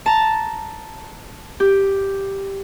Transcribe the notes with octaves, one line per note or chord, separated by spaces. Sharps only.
A5 A#5
G4